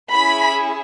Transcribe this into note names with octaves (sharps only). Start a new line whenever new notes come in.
C#4 E4 G#4 B5